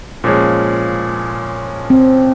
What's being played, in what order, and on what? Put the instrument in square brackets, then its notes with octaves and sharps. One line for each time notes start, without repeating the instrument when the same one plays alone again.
[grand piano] A#2 F3 G#3 C#4
[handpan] C4